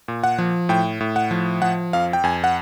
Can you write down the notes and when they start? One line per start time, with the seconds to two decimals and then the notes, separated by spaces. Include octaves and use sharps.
0.08 A#2
0.24 F#5
0.38 F3
0.69 A2 G5
1.00 A2
1.16 F#5
1.31 F3
1.62 F3 F#5
1.93 F2 F5
2.13 G5
2.24 F2 G#5
2.44 F#5